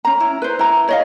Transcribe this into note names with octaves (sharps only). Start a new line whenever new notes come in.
C#4 A#5
E4
B4 C5
E4 A#5
C#5 D#5 F5